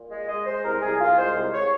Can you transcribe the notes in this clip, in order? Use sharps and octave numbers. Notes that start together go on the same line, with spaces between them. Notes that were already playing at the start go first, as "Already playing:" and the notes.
Already playing: A#2
G#3
G#3 D#5
G#3 C5
C2 A#4
C2 G#4
C2 F4
G#3 C5
C2
C#5